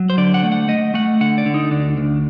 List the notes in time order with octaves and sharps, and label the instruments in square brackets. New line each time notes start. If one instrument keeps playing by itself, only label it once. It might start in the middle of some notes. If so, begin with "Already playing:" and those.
Already playing: [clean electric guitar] F#3
C5
D3 D5
F#5
A3
F#5
A3 D#5
A3 F#5
D3 F#5
D5
D3
D#4
D2 D4
D2